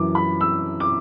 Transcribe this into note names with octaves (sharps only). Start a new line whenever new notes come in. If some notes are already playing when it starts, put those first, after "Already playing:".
Already playing: F#2 E3 D6
B5
E6
D6